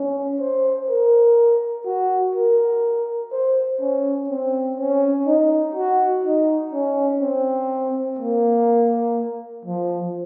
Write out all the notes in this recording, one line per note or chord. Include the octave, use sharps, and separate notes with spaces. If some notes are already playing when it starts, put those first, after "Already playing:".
Already playing: C#4
C5
A#4
F#4
A#4
C5
C#4
C4
C#4
D#4
F#4
D#4
C#4
C4
A#3
F3